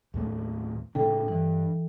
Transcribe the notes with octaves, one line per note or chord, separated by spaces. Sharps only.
D#2 A2 A3
A2 C#3 D4 A4 G5
G2 E3